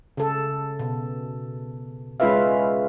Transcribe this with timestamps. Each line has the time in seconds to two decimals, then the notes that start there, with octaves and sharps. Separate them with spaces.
0.17 C#3 A4
0.79 B2
2.20 G#3 C#4 F4 B4 E5 F5